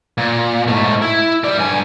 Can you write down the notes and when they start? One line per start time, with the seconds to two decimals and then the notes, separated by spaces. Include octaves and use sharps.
0.18 A#2
0.67 G#2 A3
1.02 E4
1.44 G3 D5
1.58 G2 G#5